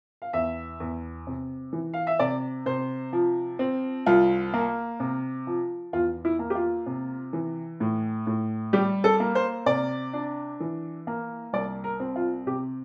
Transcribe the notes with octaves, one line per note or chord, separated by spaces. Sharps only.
F5
E2 E5
E2
C3
E3
F5
E5
C3 D5
C3 C5
F3
C4
C2 F4
A#3
C3
F3
E2 F4
E4
A#3
G4
F4
C3
E3
A2
A2
G3 G4
A4
A#3
C5
C3 D5
D4
E3
A#3
C2 D5
A#4
C4
F4
C3 G4